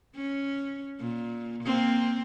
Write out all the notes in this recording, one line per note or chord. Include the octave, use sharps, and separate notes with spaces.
C#4
A#2
A#3 C4